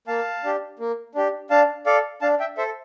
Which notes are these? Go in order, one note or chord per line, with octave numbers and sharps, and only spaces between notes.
A#3 F5 A5
D4 G4
A#3
D4 G4
D4 F5 A5
A4 D5 F5
D4 F5 A5
E5 G5
A4 C5 E5